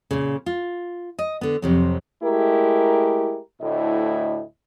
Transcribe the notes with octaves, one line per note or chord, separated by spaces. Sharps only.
A#2 C#3
F4
D#5
D3 B3
F2 C3 F#3
G#3 A3 E4 G4 A#4
D2 A2 E4 D#5